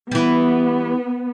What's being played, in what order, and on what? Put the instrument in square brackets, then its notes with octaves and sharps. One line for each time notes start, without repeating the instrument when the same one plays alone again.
[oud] E3 G3 [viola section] B3